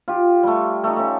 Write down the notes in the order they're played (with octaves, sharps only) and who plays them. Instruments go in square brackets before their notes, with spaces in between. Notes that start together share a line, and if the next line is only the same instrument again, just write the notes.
[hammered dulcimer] F4 G4
G3 A3
A3 D#4
A3 C#4